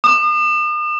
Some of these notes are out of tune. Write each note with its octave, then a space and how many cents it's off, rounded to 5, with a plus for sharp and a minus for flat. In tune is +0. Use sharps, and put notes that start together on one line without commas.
D#6 -45